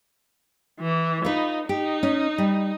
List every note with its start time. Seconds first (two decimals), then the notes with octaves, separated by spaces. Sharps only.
0.80 E3
1.25 D#4 F4 B4
1.69 D#4 G4
2.03 C#4
2.38 G3